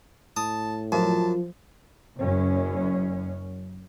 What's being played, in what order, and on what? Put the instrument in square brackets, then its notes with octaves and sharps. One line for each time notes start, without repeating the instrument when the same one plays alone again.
[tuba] A2 [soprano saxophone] A5 [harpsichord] D#6
[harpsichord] F#2 [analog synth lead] F3 [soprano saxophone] A5
[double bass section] F#1 F#2 C#4